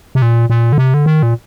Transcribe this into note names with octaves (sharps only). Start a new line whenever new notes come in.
C3
A#2
A#2
D3
C3
D3
D#3
A#2